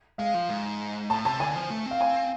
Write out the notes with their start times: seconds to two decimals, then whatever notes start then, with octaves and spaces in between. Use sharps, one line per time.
0.18 G#3 F5
0.34 F3
0.49 G#2
1.10 A2 A5
1.25 C3 A5
1.40 D3 G#5
1.55 F3
1.70 A3
1.86 C4
1.91 F5
2.01 G#5